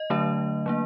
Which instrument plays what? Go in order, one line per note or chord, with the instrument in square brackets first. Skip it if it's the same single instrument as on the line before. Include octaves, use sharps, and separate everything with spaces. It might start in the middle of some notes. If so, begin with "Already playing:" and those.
Already playing: [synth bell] D#5
D3 F#3 A3 D4
F#3 A#3 D4